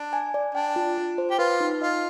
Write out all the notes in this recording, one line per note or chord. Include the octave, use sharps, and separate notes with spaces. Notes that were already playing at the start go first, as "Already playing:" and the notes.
Already playing: D4
G#5
D5
D4 G5
F4
F4
C5
G4
F4 B4
D#4
F4 D#5